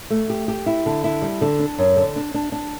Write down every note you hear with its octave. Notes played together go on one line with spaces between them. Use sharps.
A3
G4
G4
E4
D3
E4
G3
D3
D4
F#2
D3
D4
D4
D4